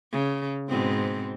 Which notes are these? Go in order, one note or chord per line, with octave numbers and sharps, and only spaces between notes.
C#3
G#2 B2 C4